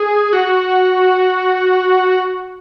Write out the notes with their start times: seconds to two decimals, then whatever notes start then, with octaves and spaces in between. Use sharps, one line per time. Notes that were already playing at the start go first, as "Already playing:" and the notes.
Already playing: G#4
0.33 F#4